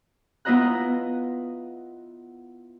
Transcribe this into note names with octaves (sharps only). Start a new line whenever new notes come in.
B3 E4 F4 D#5 A#5 F#6